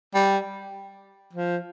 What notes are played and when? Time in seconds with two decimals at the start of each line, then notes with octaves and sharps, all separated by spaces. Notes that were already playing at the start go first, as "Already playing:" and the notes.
0.14 G3
1.33 F3